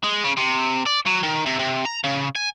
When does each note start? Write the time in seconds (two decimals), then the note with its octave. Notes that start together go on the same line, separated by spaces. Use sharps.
0.04 G#3
0.24 C#3
0.37 C3
0.86 D5
1.06 F#3
1.23 D#3
1.46 C3
1.59 C3
1.85 A#5
2.04 C#3
2.36 G#5